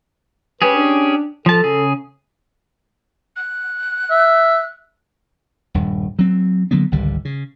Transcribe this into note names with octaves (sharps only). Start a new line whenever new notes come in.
C#4 G4 G#4 B4
D4
F3 A4 A5
C#3 G#4
F#6
E5
D#1 G2
F#3 C4
D3 F#3 A#3 B3
G#1 C#2 D3 G3
C#3